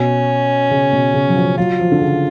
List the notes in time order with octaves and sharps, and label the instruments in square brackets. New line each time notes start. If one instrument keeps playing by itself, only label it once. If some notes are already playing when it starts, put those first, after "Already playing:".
Already playing: [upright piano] B2 [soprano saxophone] C#4
[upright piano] C#3
B2
C#3
F#3
F3
[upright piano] F#3 [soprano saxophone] F4
[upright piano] F3
D3
C#3